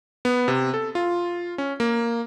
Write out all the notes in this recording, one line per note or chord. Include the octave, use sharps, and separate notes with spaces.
B3
C3
A4
F4
C#4
A#3